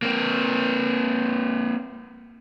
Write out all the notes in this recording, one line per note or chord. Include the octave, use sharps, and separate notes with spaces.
A#3 C4